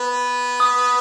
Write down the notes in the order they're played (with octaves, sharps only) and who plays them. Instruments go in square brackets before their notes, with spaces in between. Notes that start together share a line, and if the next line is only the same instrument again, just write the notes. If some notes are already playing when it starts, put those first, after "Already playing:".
Already playing: [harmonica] B3 B4
[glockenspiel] D#6